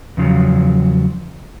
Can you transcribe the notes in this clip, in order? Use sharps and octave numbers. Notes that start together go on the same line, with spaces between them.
E2 C#3 F3 F#3